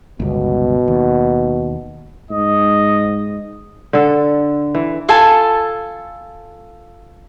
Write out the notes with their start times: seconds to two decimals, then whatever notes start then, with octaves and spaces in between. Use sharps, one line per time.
0.20 G1 C#2 B2
0.88 D#2
2.31 G#2 D#5
3.93 D3 A4
4.75 E3
5.09 F4 A4 G#5 A5